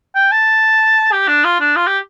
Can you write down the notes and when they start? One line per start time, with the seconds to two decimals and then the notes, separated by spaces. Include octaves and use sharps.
0.15 G5
0.31 A5
1.12 G4
1.28 D4
1.44 F4
1.60 D4
1.76 F4
1.87 G4